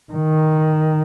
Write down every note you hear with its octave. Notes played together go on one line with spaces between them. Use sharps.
D#3